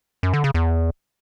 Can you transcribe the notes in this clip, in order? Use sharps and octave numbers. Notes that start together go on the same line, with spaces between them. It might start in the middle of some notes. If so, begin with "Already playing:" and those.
F#2
D3
C#3
E2